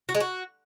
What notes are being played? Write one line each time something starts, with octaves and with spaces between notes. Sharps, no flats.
F#4
G#3
F#4